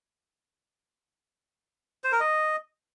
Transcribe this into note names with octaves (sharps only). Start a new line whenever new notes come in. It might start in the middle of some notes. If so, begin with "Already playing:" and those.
C5
A#4
D#5